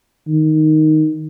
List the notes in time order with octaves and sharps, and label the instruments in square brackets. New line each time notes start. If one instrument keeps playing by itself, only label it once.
[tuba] D#3